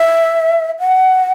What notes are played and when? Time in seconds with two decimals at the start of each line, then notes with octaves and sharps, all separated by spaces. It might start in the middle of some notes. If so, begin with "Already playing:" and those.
Already playing: E5
0.79 F#5